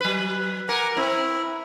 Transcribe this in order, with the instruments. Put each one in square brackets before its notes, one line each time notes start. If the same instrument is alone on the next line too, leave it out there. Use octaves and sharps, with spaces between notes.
[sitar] F#3 B4
[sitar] A#4 [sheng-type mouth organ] F#5 G#5 D6
[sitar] C4 [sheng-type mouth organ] E4